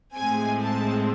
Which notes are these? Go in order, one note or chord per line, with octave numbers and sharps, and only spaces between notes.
A2 G#3 C4 G#5
A5